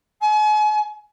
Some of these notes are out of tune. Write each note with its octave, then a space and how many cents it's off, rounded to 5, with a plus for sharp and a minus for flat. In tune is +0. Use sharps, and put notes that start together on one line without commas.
G#5 +40